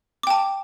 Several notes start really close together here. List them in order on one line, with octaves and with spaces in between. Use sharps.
D6 G5 A5